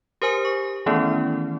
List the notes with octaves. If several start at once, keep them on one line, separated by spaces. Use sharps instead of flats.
G4 A#4 C5 G#5 D#6
C#6
D#3 E3 A3 B3 C#4 E4